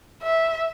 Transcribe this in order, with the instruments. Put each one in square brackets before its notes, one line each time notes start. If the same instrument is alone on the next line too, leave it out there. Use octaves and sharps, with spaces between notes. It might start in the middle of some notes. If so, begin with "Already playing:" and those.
[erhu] E5